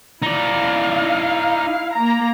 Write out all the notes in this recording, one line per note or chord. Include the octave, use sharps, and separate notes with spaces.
D#4 E4 D5 F5
A#3 A#5